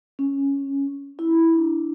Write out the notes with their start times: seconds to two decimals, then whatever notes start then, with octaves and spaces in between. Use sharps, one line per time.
0.19 C#4
1.19 E4
1.53 D4